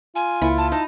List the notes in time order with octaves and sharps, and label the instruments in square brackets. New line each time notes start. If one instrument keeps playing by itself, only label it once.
[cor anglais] F4 [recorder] G#5
[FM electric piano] C#2 A#3 [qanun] E4
[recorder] A5
[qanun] D#4 [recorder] A5